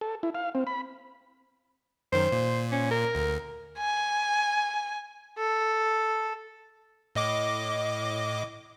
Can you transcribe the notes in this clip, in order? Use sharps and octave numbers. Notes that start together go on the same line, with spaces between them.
A4
E4
F5
C4
B5
F#2 D#3 C5
A#2
C#4
A#4
D2
G#5
A4
A2 D#5 D6